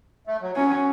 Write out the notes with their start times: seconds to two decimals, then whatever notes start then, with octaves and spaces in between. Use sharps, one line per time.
0.27 A3
0.42 F#3
0.56 F#3 C#4